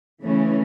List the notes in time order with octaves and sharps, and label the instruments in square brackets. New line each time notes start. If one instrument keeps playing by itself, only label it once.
[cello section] E2 C#3 E3 A3 C#4